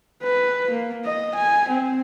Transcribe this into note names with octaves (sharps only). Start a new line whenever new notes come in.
B4
A#3
D#5
G#5
C4